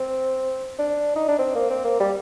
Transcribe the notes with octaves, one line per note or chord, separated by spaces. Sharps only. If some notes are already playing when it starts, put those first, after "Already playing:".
Already playing: C4
D4
D#4
D4
C4
A#3
C4
A#3
G3